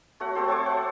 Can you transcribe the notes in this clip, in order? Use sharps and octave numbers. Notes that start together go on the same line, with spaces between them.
A3 F#4 C#5 F#5
C4 G4 A4 C5
C5 A5 C#6 D6
F#5